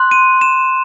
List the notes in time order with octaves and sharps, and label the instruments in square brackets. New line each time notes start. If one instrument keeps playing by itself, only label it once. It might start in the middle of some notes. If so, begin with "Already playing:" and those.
Already playing: [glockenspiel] C6 F#6
D#7
E7